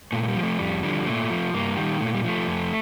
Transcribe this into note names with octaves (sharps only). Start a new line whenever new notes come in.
A#2 A3
A3
G3
F3
A3
F2 G3
D3 F3 G3
A#2 A3
F3
G2 A#3
D#3 G3
A#2 A3
G3
F3 A3
F2